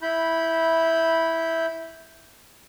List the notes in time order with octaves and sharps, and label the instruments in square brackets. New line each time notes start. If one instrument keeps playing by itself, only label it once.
[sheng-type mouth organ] E4 B5 G6